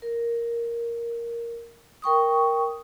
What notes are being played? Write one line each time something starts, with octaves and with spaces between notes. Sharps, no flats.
A#4
A#4 G5 C#6 D#6